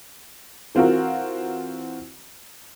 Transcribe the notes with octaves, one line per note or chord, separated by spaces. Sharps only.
E3 C4 F4 F#4 A#4